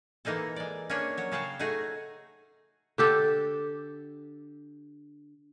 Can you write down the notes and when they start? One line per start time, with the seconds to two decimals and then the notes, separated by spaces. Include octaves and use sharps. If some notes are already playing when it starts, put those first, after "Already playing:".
0.25 E3 A#3 D#4 G#4 A4
0.56 G#3 D5
0.90 A#3 C#4 D4 G#4 C#5
1.17 F#3 C#5
1.32 C#3 F#4 G#4 F5 G5 A5
1.59 A3 D#4 F#4 G#4
2.98 D3 G4 A4